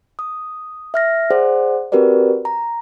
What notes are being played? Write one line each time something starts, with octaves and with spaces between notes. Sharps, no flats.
D#6
E5 F6 A#6
G#4 C5 D5 F#5
C4 F#4 G4 A#4 B4 D5
A#5